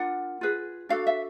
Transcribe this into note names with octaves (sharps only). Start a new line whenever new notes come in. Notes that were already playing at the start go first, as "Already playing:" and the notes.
Already playing: D4 F4 A#4 F#5
F4 G#4 B4
D4 F#4 A4 F5
E5